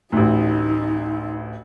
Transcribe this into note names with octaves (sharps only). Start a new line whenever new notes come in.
A1 D2 D#4